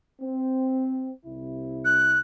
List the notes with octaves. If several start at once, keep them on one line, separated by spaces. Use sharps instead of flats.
C4
C2 C3 E4
F#6